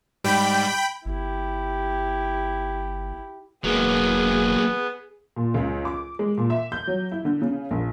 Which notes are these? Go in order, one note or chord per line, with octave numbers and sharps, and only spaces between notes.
G#2 G3 G5 B5
G1 E4 G4
E1 F#3 A#3 B3 G#4
A#2
C#2
D6
G#3
A#2
E5
G6
F#3
E4
D3
C#3
A#1